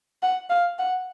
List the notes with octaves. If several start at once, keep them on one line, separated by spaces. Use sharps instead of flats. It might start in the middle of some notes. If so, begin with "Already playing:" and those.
F#5
F5
F#5